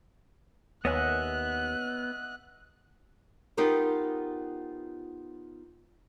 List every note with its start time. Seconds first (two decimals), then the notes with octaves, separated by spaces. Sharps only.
0.85 D#2 B3 C#5 D#5 E5 F#5 G#5 F#6
3.57 B3 D#4 F4 G4 A#4 C5